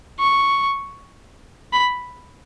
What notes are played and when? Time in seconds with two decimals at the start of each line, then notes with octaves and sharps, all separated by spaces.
0.20 C#6
1.73 B5